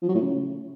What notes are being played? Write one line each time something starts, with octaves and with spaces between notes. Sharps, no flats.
F3
F#3
A2
C#3